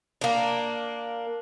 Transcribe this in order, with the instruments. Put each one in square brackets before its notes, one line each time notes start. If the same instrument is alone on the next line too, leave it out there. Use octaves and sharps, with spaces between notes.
[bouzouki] A#3 D4